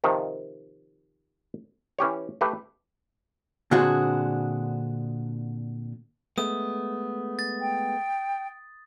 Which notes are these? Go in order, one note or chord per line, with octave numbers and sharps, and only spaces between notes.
C3 D#3 F3
E3 C#4 G4 C#5
A3 G4 B4
A#2 D3 C4 D4 F#4 G#4
G#3 A3 B3 D#6
A6
G5